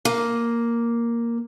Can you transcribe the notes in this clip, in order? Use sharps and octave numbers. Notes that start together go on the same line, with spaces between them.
A#3